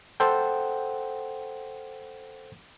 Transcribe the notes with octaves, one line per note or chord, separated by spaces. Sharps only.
A4 C5 F#5 G5